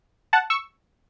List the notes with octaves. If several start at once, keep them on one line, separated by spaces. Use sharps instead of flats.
F#5 A5
C#6 E6